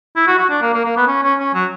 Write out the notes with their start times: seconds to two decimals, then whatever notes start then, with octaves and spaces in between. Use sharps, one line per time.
0.16 E4
0.27 F#4
0.38 F#4
0.50 D4
0.62 A#3
0.74 A#3
0.85 A#3
0.97 B3
1.08 C#4
1.23 C#4
1.40 C#4
1.55 F#3